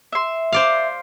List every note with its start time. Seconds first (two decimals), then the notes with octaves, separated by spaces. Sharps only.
0.13 E5 C6
0.52 C5 D5 F5